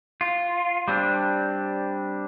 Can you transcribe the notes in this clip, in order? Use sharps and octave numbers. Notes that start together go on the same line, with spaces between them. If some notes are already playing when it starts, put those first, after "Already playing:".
F4
G3 C4 D4